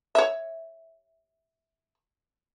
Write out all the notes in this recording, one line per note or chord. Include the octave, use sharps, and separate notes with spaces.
C#5 E5